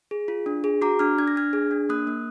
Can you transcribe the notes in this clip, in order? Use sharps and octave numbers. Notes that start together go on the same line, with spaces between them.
G#4
F4
D4
G#4
F#4 A#5 D6
D4 D6 F6
D4 G#6
A#6
D4 F6 G#6
G#4
D4
A#3 D#6 F#6
A#3